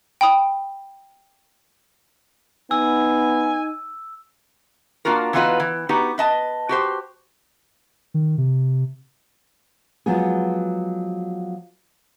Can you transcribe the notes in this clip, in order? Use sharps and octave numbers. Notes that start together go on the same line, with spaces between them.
G5 B5 D#6
B3 D#4 G#5 E6
A#3 D4 F4 F#4 A#4
E3 B3 D#4 F4 F#4 B4
E3
B3 D#4 F#4 G4
B4 D#5 A5
F#4 G4 C5
D#3
C3
F3 F#3 G#3 B3 F#4 G#4